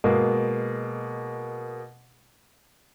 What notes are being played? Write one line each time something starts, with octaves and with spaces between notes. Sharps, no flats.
B2 G#3 A#3